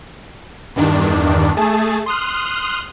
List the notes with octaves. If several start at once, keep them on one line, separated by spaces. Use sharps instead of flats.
E2 G2 D#3 D4
A3 G#4 A5
C6 D#6 F6 F#6